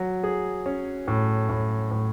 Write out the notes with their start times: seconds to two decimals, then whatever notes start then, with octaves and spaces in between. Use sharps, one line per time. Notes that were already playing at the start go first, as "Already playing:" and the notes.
Already playing: F#3
0.24 G#4
0.66 C#4
1.08 A2
1.49 A2
1.91 A2